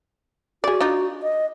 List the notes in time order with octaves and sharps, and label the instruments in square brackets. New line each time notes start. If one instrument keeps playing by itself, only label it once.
[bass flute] F#4 [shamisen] G#4 D5
[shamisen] D4 D#4 F4
[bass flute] D#5